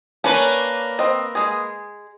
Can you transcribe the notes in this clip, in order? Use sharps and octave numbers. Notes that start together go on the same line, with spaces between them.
A#3 C#4 D4 B4 C#5
C4 D#5
G#3 G#4